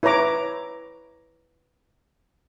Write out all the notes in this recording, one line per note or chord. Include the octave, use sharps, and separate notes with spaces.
E4 B4 C#5 A#5 D6